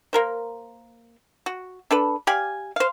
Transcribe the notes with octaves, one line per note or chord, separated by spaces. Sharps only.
A#3 A#4 C5
F#4
D4 A4 B4
G4 D5 F5 G#5
C5 F5